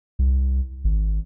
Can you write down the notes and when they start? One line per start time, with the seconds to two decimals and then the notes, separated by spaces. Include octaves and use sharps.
0.19 C2
0.84 G#1